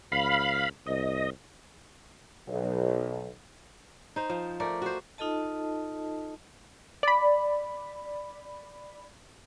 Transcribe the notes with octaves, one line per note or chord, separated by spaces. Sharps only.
C#2 F5 B5
C2 D#5
B1
D#4 C5
F3
A3 A#4 D5
F#4 C5
D#4 F4 A4 D#5 A5
D5 B5